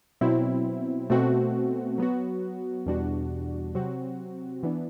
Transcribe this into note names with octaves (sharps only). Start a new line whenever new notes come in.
B2 F#3 C4 E4
B2 A3 C4 F#4
F#3 B3 F#4
E2 B2 G3 D4 F#4
C3 F#3 C4 F#4
E3 B3 D4